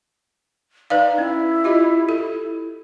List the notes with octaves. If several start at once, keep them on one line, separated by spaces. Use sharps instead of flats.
D#4 B4 D5 F5
C#4 E4
F4 G4 D#5
A4